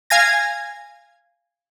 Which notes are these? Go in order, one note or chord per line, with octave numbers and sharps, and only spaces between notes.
F5 G#5 G#6 A#6